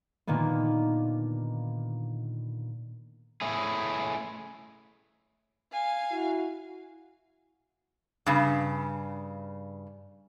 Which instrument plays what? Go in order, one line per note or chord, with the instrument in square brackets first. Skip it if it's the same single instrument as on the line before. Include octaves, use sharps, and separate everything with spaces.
[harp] A#2 D3 D#3 A#3 B3
[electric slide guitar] A3 C#4 E4 G#4
[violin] F5 G#5
[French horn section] E4 F#4
[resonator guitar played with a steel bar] G2 C#3